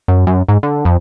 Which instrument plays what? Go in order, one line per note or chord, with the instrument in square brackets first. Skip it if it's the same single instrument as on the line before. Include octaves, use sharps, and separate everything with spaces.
[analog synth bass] F#2
F#2
G#2
D3
F2